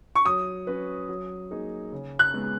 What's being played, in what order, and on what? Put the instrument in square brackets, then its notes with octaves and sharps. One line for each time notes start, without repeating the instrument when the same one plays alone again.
[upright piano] C#6
[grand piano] F#3 [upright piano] D#6
[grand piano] C#4 F#4 B4
F#3
A#3 D#4 G#4
C#3
[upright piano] F#6
[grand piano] G#3 B3